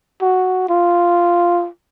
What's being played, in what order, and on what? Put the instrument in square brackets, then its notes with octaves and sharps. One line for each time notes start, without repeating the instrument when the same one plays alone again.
[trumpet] F#4
F4